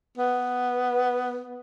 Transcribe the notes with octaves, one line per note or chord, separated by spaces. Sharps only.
B3